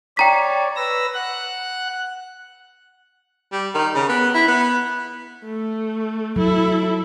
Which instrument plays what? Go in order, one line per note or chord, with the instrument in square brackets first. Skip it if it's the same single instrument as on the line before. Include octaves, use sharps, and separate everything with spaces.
[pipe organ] C#5 D5 [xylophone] G5 A#5 B6
[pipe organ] B4 E6 A#6
F#5 F#6
[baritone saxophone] G3
D#3
C#3
B3
E4
B3
[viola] A3
[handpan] F#3 [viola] E4 A4